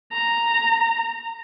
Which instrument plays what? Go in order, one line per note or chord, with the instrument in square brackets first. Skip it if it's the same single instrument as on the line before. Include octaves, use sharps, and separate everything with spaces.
[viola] A#5